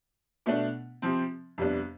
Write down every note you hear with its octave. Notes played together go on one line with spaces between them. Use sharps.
B2 A3 D4
C3 F3 C4
F2 C3 G3 B3 D4